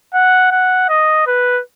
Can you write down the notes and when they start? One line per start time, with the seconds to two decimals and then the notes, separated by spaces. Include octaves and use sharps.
0.14 F#5
0.51 F#5
0.89 D#5
1.27 B4